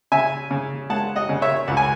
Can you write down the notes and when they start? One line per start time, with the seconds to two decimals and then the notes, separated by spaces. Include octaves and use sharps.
0.12 C#3 E5 G#5
0.51 C#3
0.90 G#3 F#5 A5
1.16 D#5 F#5
1.29 C#3
1.42 C#5 E5
1.68 C#2 F#5
1.77 G#5